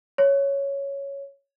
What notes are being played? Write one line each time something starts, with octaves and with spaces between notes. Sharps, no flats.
C#5